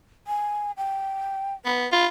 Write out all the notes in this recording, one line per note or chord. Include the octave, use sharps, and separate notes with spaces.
G#5
G5
B3 B4
F4 B5